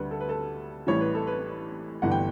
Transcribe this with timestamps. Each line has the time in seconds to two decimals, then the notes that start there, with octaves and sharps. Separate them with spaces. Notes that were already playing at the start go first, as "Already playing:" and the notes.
Already playing: D2 D3 G3 B4
0.11 A4
0.20 B4
0.29 A4
0.87 A1 A2 E3 G3 C#5
1.01 B4
1.15 A4
1.27 B4
2.02 G1 G2 E3 F#5
2.11 G5